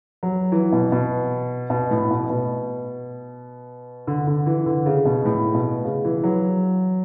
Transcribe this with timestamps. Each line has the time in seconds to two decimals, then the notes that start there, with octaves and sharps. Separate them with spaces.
0.23 F#3
0.52 E3
0.72 B2
0.92 B2
1.70 B2
1.91 A2
2.11 B2
2.30 B2
4.07 D3
4.27 D3
4.46 E3
4.66 D3
4.86 C#3
5.05 B2
5.25 A2
5.55 B2
5.84 C#3
6.05 E3
6.24 F#3